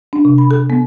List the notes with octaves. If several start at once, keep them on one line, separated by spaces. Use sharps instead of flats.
D4
C3
B5
A4
B3